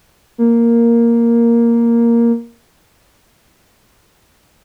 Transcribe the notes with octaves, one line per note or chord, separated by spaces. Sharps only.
A#3